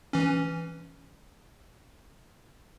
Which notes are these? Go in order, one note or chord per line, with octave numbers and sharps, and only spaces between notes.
E3 C#4